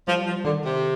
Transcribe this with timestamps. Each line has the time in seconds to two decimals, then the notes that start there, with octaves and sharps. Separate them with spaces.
0.07 F3 G3
0.26 F3
0.44 D3 D#3
0.64 C3